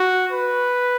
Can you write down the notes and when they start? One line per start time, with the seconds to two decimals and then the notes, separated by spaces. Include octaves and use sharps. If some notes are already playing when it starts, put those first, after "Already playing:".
Already playing: F#4
0.32 B4